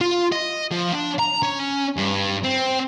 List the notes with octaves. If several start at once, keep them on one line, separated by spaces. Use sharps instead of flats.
F4
D#5
F3
D4
A#5
C#4
G2
C4